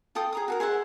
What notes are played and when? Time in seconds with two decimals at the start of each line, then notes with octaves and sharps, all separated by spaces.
0.15 F4 A4 G5 D#6
0.33 G#4 A#5 D#6
0.48 F#4 A4 A#4
0.60 G#4 C5 E5 F#5